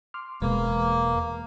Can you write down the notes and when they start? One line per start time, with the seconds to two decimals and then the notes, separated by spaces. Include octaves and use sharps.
0.14 C6 D6 F6
0.42 E1 G#3 A#3 B4